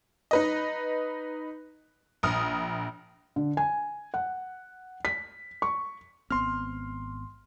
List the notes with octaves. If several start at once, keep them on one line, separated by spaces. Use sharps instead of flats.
D#4 B4 D#5
A#1 D#6 F6
D3
G#5
F#5
B6
C#6
G#1 B3 C4 C6 F6